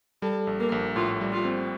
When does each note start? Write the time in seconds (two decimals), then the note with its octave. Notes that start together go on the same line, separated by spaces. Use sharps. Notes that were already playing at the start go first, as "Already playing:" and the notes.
0.22 G3 A4
0.47 A#1
0.60 A#3
0.72 A#1
0.96 A2 F4
1.21 G3
1.33 F4
1.45 C4